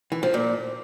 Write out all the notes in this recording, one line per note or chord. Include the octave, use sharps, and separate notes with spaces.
E3
F3
A#2